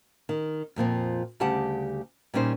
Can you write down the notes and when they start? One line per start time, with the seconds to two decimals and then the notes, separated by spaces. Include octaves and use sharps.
0.29 D#3
0.76 F2 A#2 F3 C4
1.40 D2 C#3 G3 G4 F#5 A5
2.34 A#2 G3 C#4 D#4 C5